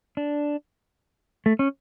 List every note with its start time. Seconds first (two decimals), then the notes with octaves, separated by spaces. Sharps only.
0.17 D4
1.46 A3
1.59 C#4